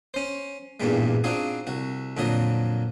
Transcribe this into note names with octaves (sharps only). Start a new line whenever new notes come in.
C#4 C5
A1 E2 G2 A#2 G3 G#3
C4 D4 D#4 F4 F#4 G#4
C2 F#4
F2 A#2 D3 F3 F#3 D#5